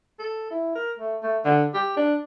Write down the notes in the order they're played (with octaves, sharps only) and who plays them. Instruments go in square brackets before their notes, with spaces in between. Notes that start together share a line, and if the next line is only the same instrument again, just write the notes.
[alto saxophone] A4
E4
A#4
A3
A3
D3
G4
D4